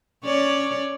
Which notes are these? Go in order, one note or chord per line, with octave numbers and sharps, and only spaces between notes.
C#4 C#5 D5